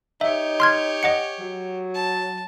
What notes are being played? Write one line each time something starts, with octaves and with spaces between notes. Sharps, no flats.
D#4 G4 C#5 E5
C6 F6 G#6
D#5 F#5 C#7
F#3
A5